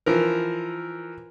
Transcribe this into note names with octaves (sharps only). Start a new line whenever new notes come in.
E3 F3 A#4